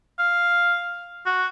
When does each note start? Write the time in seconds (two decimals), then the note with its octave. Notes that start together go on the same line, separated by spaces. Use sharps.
0.19 F5
1.26 F#4